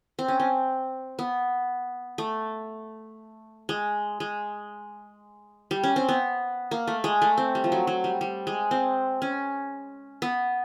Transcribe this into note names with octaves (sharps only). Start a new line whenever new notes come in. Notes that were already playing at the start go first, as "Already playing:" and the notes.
C4
C#4
C4
B3
A3
G#3
G#3
G3
C#4
C4
B3
A#3
A3
G#3
A3
C4
G3
F3
F#3
F#3
G3
G3
G#3
C4
C#4
B3